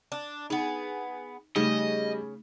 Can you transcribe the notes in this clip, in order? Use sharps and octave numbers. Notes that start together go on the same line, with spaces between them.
D4
B3 D#4 G#4
C#3 G3 A3 D#4 D#5